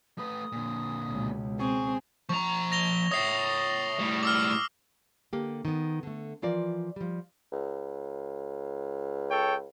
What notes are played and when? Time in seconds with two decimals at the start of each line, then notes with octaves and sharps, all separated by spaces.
0.18 A3 B4 D#6
0.52 A#2 D3
1.09 C#2 B2
1.60 C4 G#4 C#6
2.29 F3 A#5 C#6
2.72 A#6 F7 G7
3.12 C#5 E5 D#6 C7
3.99 A2 G3
4.23 D6 E6 F6
5.33 D3 A#3 G4
5.65 D#3 B3
6.03 D3 A3
6.42 E3 F3 F4 A#4 D5
6.96 F3 G3
7.52 C#2
9.30 A4 C#5 G5